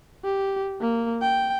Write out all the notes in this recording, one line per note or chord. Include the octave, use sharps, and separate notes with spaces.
G4
A#3
G5